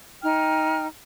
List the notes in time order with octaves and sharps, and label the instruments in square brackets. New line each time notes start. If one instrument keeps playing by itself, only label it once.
[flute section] D#4 G5 F6